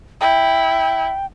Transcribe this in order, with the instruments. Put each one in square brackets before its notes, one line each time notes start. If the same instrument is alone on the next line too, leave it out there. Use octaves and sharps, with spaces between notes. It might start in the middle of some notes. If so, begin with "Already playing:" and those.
[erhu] E4 [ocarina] G5